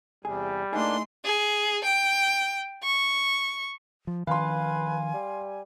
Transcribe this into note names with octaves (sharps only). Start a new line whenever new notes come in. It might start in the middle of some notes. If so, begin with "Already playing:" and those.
E2 C3 G3 G#4
A2 A3 A#3 D4 D#4 G#4 C6
G#4
G5
C#6
F3
D#3 F3 C#4 B4 F5 G#5 C6
G3